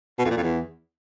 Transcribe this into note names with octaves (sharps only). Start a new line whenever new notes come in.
B2
F2
A#2
F2
E2